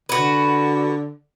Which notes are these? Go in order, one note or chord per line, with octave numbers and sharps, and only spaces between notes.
D3 F#4 B4